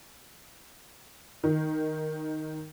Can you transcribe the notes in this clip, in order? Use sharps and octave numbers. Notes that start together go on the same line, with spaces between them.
D#3